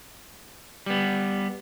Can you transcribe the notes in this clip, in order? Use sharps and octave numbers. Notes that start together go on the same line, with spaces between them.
G3 B3